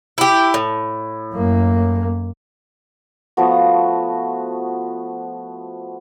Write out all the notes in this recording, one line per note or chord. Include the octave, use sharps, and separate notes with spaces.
E4 G4
A2
F#2 A#3
F3 A3 B3 F#4